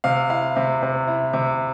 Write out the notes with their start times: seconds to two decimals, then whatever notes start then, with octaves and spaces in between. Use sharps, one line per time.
0.04 C3 F5
0.30 E4 F5
0.56 C3 E5
0.83 C3
1.07 E4
1.34 C3